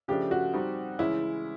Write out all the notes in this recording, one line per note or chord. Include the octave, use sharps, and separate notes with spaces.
C#3 F3 A3 D4 G4
F#4
G3 C4 D#4 F#4
C#3 E3 G#3 C#4 E4